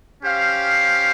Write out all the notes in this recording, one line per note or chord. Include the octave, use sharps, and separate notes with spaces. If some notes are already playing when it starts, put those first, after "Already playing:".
C#4 G4 C5 F5